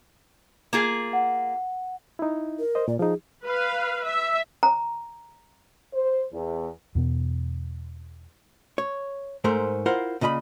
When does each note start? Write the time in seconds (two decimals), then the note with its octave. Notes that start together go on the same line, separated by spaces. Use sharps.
0.73 A#3 F4 G#4
1.13 F#5
2.19 D#4 E4
2.59 A#4
2.75 C5 D#5
2.88 A#2 D5
2.99 F3 D#4 G#4
3.43 B4 F5
4.05 E5
4.63 A#5
5.94 C5
6.33 E2
6.95 E2 B2 B3
8.78 C#5
9.44 G#2 A3 A#4 C5
9.86 E4 F4 A#4 C5 F#5
10.21 A#2 C#3 D#5 A#5 B5